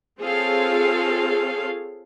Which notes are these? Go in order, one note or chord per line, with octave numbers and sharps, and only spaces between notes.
C4 F4 G#4 A4 C#5 F5